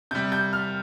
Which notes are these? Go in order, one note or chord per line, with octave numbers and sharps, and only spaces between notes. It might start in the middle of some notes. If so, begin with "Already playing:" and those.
C3 G3 G6
G6
F6